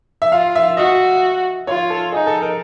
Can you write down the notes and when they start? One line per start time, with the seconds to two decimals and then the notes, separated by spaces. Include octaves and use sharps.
0.22 E5
0.32 F4 F5
0.55 E5
0.77 F#4 D#5
1.67 F4 C#5
1.90 A4
2.12 D#4 G#4
2.27 A4
2.42 A#4